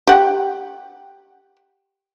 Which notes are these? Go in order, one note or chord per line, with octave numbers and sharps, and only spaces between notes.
G4 F#5